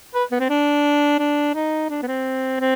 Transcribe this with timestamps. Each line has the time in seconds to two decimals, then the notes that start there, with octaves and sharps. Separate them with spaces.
0.15 B4
0.32 B3
0.40 C4
0.50 D4
1.19 D4
1.55 D#4
1.90 D4
2.03 B3
2.08 C4
2.60 C4